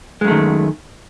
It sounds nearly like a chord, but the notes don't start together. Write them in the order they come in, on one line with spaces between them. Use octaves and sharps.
G#3 F#2 A3 D#3